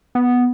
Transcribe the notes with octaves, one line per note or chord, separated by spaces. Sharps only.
B3